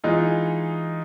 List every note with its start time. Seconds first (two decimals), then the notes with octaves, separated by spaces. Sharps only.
0.04 E3 G#3 D#4 F4